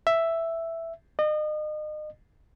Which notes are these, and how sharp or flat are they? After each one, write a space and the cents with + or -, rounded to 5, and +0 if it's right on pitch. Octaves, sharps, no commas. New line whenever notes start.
E5 +5
D#5 -35